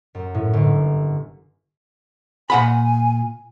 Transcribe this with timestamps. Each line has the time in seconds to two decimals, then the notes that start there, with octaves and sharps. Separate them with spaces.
0.15 F#2
0.34 A2
0.53 G1
2.50 A#2 F#5 G#5 B5